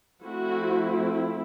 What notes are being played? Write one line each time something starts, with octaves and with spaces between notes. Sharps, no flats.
F3 A3 C4 E4 F#4